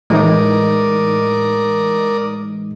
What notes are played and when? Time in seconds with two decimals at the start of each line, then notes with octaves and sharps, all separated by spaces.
0.10 A2 E3 G#3 D#4 A#4 D5 D#6